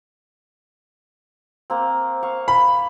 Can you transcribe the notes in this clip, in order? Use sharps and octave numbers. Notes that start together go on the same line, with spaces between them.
A#3 C4
F5 C#6
B5